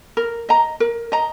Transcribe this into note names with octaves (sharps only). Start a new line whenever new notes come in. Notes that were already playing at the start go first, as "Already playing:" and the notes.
A#4
D#5 A#5
A#4
D#5 A#5